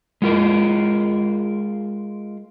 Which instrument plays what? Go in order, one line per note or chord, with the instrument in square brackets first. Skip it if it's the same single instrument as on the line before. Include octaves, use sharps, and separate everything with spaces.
[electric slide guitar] G#3 F4 A#4